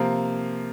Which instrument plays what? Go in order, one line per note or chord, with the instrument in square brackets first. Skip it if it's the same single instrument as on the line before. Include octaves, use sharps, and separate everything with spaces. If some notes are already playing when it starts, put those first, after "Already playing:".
Already playing: [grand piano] C3 F3 A#3